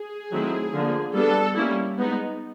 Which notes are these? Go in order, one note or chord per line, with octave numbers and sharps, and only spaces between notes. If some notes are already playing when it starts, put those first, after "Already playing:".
Already playing: G#4
D#3 F#3 A3 C4 E4
D3 F3 A#3
G3 B3 D4 A4
G3 A#3 C#4 E4
G#3 B3 D#4